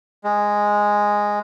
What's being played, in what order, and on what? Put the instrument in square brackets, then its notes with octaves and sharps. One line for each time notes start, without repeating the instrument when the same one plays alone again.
[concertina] G#3